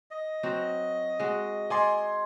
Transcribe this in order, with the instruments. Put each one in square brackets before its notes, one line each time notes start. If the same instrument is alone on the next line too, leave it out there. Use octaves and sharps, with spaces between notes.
[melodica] D#5
[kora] F#3 C4 F#4
G#3 F#4
[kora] D5 [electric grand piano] D#5 G#5 C6